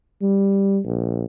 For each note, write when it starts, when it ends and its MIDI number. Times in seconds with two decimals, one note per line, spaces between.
0.22 0.79 55
0.85 1.26 34